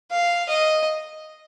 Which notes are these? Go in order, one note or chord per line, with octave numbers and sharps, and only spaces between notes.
F5
D#5